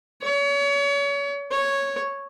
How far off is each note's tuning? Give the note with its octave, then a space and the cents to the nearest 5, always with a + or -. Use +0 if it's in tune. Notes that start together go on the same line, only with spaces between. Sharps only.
C#5 +35
C#5 -5